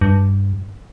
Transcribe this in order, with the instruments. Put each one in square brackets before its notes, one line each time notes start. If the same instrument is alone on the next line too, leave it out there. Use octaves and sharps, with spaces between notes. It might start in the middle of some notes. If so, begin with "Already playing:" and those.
[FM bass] G2